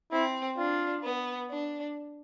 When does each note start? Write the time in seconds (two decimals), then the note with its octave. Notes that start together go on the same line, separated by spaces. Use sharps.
0.11 C4 E4
0.57 D4 F4
1.03 B3
1.50 D4